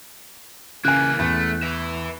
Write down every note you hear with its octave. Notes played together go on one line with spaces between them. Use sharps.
C#3 E3 A#3 G#5 F#6
E2 A3
B4 E5